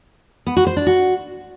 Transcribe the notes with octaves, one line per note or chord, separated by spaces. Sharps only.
B3
F#4
C5
D4
F#4